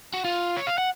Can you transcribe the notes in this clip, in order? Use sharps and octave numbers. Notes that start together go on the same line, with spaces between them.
F#4
F4
C#5
F5
F#5